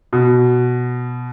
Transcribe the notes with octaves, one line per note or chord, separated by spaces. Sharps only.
B2